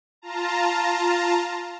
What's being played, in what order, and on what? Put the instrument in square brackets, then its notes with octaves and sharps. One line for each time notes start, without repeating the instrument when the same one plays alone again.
[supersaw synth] F4 A5 A#5